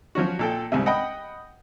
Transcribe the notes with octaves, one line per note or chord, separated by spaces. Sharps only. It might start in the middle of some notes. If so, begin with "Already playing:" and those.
F3 F#3 C#4 F#4
A#2 A4 G5
C2 G#2 C3
D#5 F#5 G5 B5